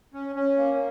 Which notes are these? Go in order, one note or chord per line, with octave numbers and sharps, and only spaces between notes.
C#4
C#4
A#3